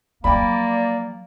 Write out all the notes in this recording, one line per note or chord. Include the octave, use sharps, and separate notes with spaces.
F3 F#3 A#3 D5 G5 B5